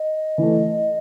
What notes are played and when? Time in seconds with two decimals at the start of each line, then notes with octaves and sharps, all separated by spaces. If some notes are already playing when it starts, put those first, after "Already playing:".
Already playing: D#5
0.38 E3 A3